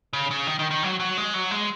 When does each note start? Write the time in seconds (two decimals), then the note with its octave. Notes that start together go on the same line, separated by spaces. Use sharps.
0.13 C#3
0.31 C#3
0.47 D#3
0.59 D#3
0.71 D#3
0.83 F#3
1.00 F#3
1.17 G#3
1.34 F#3
1.51 G#3